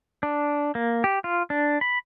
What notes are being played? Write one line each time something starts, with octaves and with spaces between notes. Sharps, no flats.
D4
A#3
G4
F4
D4
B5